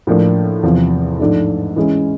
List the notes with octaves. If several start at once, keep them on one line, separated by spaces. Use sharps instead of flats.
A2 F3 A#3 D4
E2 C3 F3
G#2 F3 A3 D4
E3 G#3 C#4